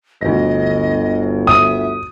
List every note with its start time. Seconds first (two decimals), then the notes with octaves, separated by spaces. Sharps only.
0.21 G1 D2 D#5 A#6
1.47 E5 D#6